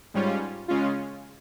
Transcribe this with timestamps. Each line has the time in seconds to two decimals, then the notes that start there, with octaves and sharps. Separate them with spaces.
0.14 G#2 G3 C#4 F4
0.68 C#3 G#3 C#4 F4